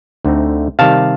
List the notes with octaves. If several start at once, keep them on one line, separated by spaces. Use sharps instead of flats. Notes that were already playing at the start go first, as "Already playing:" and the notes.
D2 D3 A3 C4 D#4
C3 D#3 G3 F5 A5